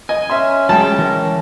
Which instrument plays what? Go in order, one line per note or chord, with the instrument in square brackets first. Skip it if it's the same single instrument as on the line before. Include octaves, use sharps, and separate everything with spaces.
[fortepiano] D#5 [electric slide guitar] G#5
[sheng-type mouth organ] C#4 [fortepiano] E5 C6
[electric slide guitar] F#3 G#3 [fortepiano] G5 A5
[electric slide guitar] E3 A#4